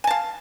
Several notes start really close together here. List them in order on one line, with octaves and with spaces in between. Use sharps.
G#5 A5 F5